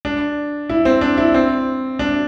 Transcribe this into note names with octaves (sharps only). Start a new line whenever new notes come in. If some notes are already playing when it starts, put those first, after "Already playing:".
D4
E4
C4
D4
E4
C4
D4